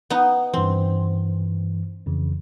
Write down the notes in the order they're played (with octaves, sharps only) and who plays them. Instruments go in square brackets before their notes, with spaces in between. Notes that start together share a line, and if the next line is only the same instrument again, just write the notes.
[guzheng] B3 D#4
[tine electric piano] G2 E3 [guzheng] C4
[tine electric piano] F2 C#3 E3